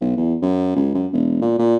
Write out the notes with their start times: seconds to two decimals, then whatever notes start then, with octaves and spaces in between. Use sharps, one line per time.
0.01 B1
0.17 E2
0.42 F#2
0.76 C#2
0.94 F#2
1.13 E1
1.41 A#2
1.59 A#2